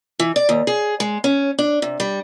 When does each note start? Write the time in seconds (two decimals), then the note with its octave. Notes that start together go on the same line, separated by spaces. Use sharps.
0.20 E3
0.36 D5
0.49 D#2
0.67 G#4
1.00 G#3
1.24 C#4
1.59 D4
1.82 C3
2.00 G3